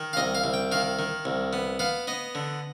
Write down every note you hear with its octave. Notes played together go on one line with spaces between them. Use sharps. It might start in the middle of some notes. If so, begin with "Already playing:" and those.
Already playing: D#3
F5
C2 D#5
F5
C2
G5
D#3 F5
D#3
C2
B3
B3 F5
B3 D#5
D3